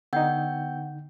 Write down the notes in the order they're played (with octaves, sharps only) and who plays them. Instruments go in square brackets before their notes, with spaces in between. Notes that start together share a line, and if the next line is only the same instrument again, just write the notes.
[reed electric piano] D3 D#4 [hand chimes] B3 G5 G6 [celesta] F#5